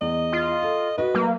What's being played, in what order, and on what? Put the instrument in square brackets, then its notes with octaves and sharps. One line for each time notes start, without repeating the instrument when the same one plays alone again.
[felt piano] E2 [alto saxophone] D#5
[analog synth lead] F4
[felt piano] A4
[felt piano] F#4 D#5 [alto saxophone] B4
[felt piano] F#3 [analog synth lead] A#3